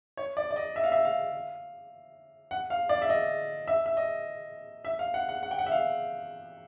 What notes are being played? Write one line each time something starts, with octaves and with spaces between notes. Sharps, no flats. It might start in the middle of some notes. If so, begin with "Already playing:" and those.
C#5
D5
D5
D#5
E5
F5
E5
F5
F#5
F5
D5
E5
D#5
E5
E5
D#5
E5
F5
F#5
F#5
F#5
G5
F#5
E5
F5